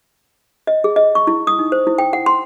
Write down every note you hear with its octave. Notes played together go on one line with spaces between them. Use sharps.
D#5
G#4
D#5
C#6
E4
D#6
D#4
C5
E4
G5
F#5
C6